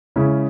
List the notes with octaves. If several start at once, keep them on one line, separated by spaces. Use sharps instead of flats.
C#3 G#3 C#4 E4